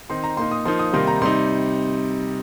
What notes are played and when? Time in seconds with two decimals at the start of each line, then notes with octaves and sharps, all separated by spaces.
0.10 D#3 C4 D#4 C6
0.24 A#5
0.37 A#2 A#3 D#4 C6
0.51 D#6
0.65 F3 A#3 D#4 C6
0.79 D#6
0.93 C3 D#3 G3 A#3 D#4 C6
1.07 A#5
1.22 C3 G3 D#4 C6